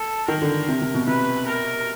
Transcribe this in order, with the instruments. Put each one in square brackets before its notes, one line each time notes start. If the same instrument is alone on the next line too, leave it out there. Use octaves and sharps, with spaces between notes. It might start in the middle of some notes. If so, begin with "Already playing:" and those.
Already playing: [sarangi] A4
[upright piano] D#3 [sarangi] A#4
[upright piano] D3
C3
C3
B2
[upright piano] C3 [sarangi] B4
[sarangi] A#4